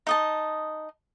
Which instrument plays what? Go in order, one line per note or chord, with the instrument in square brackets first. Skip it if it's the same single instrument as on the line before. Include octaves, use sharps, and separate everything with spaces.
[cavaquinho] D#4 D#5 A5